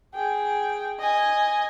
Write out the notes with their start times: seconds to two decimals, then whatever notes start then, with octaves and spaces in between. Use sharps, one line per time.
0.14 G#4 G5
1.00 D#5 G#5